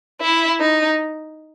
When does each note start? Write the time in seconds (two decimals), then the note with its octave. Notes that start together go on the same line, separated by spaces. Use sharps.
0.21 E4
0.60 D#4